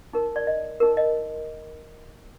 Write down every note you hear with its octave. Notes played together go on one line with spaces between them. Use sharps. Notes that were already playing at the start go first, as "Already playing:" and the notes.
D#4 A#4
D5
D#5
D#4 A#4
D#5